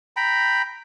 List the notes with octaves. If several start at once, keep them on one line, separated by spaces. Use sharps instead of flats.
G5 A#5 B5